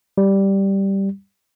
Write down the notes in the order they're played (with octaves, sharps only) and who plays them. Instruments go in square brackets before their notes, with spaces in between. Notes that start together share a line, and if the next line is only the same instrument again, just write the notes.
[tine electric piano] G3